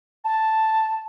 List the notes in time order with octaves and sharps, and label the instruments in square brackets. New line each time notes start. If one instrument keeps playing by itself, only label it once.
[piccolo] A5